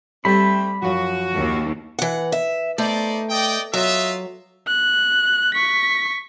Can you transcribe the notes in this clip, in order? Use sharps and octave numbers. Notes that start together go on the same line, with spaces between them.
G3 A3 C4 B5
F#2 F3 F#4
D#2
E3 F#5
E5
A3 D#4 C5 D5
D5 D#5 G5
F#3 F4 D#5 E5
F#6
C#6 B6